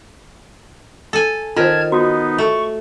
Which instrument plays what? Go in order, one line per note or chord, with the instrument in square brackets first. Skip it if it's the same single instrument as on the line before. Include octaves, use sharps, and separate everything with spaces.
[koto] A4 G#5
[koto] D#3 [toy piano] F4 C5 [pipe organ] A5 F6 G#6
[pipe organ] B3 D#4 [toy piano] F#4
[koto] A3 [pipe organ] C#6